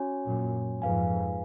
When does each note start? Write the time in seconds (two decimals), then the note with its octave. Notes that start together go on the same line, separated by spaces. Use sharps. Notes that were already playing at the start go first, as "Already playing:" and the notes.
Already playing: C#4 F#4 C#5 G#5
0.27 F#2 A#2
0.82 F2 G#2 G#4 B4 F5 G#5